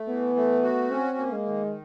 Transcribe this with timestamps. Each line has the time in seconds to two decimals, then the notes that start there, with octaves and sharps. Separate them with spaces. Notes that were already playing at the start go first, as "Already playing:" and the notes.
Already playing: A3
0.08 E3 B3
0.36 A3
0.63 F#4
0.91 C4 C#4
1.18 A#3
1.32 G#3
1.46 D#3